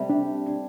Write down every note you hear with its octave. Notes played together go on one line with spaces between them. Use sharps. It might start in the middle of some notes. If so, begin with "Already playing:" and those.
Already playing: C3 G3 A3
D4 G4